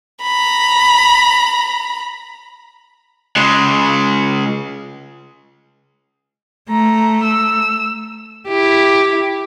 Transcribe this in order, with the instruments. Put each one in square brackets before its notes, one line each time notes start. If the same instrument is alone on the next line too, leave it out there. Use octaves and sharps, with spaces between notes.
[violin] A#5 B5
[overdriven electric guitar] C#3 G#3
[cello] A3 [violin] A#5
[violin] E6
[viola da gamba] E4 G4